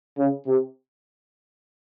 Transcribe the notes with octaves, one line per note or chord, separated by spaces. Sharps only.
C#3
C3